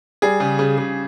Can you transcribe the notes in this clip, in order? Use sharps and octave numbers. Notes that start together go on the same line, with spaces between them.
G3 G#4
C#3
C#3
C#3